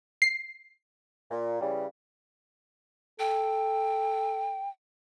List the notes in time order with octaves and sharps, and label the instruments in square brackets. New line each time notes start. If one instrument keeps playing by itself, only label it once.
[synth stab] C7
[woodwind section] A#2
C#3 E3 G3
[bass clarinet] A4 [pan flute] G5